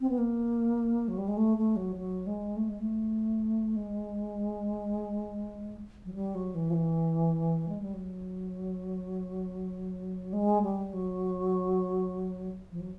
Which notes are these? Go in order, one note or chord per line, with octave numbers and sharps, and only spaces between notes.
C4
B3
A#3
F#3
G3
G#3
A3
A3
F#3
F#3
G#3
A3
G#3
A3
G#3
F#3
G3
F#3
E3
F3
E3
G#3
G3
F#3
G#3
G3
F#3
F3
F#3